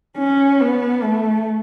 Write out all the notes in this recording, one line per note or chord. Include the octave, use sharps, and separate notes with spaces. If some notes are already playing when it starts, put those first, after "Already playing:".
C#4
B3
A3